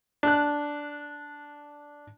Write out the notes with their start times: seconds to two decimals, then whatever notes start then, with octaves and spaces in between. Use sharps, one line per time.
0.23 D4 F#6